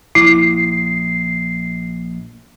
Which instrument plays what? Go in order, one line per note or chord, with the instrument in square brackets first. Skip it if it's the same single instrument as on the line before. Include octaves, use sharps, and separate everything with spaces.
[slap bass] A#1 [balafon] E4 [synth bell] C7